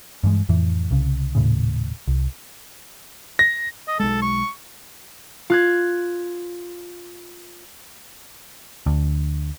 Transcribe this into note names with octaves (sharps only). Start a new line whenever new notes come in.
G2 E3 G#3
F2 A2 E3
C2 C#3
D#1 A2 C#3
C2
A#6
D#5
B1 G#3 A4
C#6
F4 F#6 G#6
D2